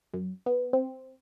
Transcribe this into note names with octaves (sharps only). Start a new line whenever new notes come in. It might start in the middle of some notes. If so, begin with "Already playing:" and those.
F#2
B3
C4